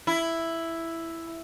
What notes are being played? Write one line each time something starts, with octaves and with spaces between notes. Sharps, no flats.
E4